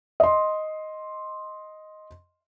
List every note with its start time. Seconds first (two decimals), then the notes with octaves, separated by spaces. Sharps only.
0.20 D#5 C6